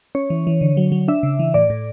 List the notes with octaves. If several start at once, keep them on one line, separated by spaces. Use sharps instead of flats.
C#4 C#5
E3
E3
D3
F#3
F#3
D4 E5
C#3
E3
A2 D5
A2